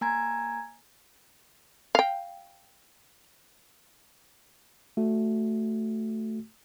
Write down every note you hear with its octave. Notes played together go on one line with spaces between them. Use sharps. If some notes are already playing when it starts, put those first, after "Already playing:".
A#3 G#5 A#5 G#6
F5 G5
A3 F#4